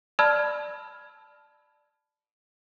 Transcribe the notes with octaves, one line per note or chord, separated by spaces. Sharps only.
D5 A5 B5 E6 F6 G#6